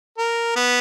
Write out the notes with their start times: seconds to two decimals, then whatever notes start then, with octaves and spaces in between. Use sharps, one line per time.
0.18 A#4
0.56 B3